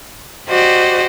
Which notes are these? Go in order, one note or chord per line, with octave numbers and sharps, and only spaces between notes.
F#4 G4 C5 D5 D#5